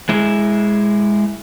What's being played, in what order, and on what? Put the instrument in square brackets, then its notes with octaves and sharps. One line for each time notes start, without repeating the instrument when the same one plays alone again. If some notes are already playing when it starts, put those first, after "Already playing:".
[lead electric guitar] G#3 E4